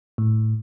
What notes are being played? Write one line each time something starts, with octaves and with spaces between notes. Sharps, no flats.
A2